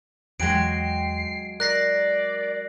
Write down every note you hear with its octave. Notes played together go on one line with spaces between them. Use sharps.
E2 F#3 G#3 G5 C7 D7
A#4 D5 F#6 A#6 C7